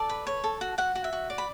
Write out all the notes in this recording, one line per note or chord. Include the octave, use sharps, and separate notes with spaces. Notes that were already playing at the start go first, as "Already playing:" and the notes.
Already playing: A4 D5 A5
B4
C#5
A4
F#4
F#4 F#5
F#4
E5
F#4
D5
B5